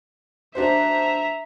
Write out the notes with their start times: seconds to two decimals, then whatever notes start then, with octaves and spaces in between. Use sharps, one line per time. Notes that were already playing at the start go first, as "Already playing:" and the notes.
0.55 D4 F#4 C5 E5 A#5